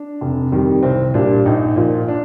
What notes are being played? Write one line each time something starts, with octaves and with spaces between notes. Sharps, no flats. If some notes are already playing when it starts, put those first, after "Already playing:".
Already playing: D4
F1
F2 D#3 G3
C2 C4
A#2 G3 D4
A#1 D#4
A#2 F3
D4